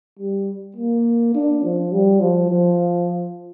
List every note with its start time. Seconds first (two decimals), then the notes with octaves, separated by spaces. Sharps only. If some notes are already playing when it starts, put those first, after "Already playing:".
0.19 G3
0.76 A#3
1.35 D4
1.63 F3
1.92 G3
2.20 F3
2.50 F3